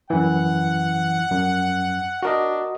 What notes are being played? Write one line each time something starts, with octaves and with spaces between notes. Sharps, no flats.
F#2 E3 F#5
F#2
D4 F#4 A#4 D#5